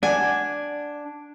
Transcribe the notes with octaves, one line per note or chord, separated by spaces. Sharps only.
D4 D5 F#5 G#5